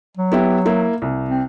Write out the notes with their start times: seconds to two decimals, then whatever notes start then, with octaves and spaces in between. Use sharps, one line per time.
0.17 F#3
0.32 B3 E4 G4
0.66 A#3 E4
1.02 C2
1.29 C4